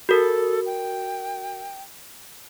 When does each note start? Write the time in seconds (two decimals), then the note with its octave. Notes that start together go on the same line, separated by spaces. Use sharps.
0.09 F#4 A4 A#4
0.66 G5